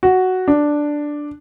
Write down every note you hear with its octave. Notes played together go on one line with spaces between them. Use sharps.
F#4
D4